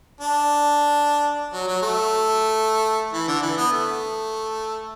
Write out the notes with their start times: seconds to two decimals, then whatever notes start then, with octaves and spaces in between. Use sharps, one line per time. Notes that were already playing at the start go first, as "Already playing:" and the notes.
0.21 D4
1.53 F#3
1.67 F#3
1.82 A3
3.13 E3
3.28 D3
3.42 E3
3.58 B3
3.72 A3